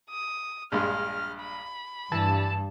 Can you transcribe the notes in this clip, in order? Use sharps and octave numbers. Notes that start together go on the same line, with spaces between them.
D#6
A#1 G2 G#3 F6
B5
G2 E3 A5